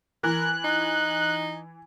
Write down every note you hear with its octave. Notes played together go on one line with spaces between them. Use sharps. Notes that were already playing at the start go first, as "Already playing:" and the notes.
E3 A#4 F#6
D#4